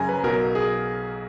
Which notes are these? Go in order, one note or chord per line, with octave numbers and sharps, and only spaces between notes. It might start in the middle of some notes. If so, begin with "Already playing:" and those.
Already playing: F#2 C#3 G#5 A#5
B4
B1 B2 F#3 A#4
G#4